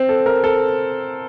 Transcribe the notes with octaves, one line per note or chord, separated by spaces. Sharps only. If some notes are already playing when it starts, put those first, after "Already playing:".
Already playing: C4
A4
A#4
A4